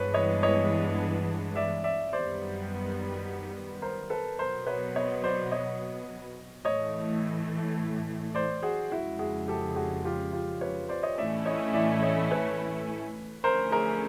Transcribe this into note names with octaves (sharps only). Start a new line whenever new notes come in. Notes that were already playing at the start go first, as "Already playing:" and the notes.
Already playing: G2 E3 G#3 B3 D4 B4 C#5
C#5 D#5
C#5 D#5
D5 E5
D5 E5
F#2 D#3 G3 B3 C5 D5
A#4 C5
A4 B4
B2 F#3 B3 A#4 C5
B4 C#5
C#5 D#5
C5 D5
C#5 D#5
A2 E3 A3 C#5 D#5
C5 D5
F#4 G#4
F2 C#3 F3 G#3 E4 F#4
F#4 G#4
G4 A4
F#4 G#4
F4 G4
F4 G4
B4 C#5
C5 D5
C#5 D#5
A2 E3 A3 C#4 E4 D5 E5
C#5 D#5
D5 E5
C#5 D#5
B4 C#5
D3 F3 A3 C#4 E4 A#4 C5
G#4 A#4